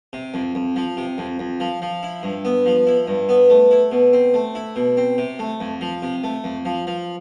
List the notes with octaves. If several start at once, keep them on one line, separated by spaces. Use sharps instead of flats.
C3
F2
F2
F3
C3
F2
F2
F3
F3
E4
G2
B3
F3
E4
G2
B3
A3
E4
B2
C4
A3
E4
B2
C4
C3
A3
F2
F3
C3
A3
F2
F3
F3